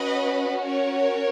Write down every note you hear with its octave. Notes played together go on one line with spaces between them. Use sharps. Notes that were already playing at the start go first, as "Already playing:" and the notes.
Already playing: C#4 F#4 B4 D#5
A#4 C#5